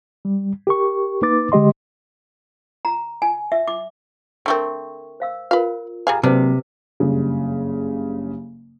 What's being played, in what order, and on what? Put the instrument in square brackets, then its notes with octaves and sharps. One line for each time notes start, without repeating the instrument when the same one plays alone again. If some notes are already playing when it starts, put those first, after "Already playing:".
[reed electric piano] G3
G4 A#4 C#6
A#3 D#4 B4 D6 A6
D3 G#3 G4 D#5 C6
[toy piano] A#5
G#5
E5
D6
[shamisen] D3 A3 C4 [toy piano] A#4 C#6
[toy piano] C5 F5 E6
[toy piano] F4 A#4 [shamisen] B4 F5
[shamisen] G3 G#4 F5 [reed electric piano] G#5 A#5
[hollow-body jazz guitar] C3 [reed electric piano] F#3 A#3 C4 [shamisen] D4 [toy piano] B4 C5
[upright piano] F#1 G2 C#3